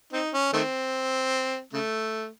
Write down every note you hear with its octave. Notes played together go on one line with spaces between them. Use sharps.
C4 D#4
C#4
D#3 A3 C4
C#3 A3